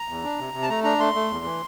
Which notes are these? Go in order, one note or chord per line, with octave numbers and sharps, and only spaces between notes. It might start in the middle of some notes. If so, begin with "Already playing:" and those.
Already playing: A#5
E2
D4
C3
C3
A5
A3 A#5
D4 A#5
A3 C6
A3
E2
E3